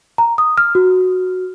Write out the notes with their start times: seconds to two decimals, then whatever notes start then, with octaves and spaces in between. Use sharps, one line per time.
0.18 A#5
0.38 D#6
0.58 F6
0.75 F#4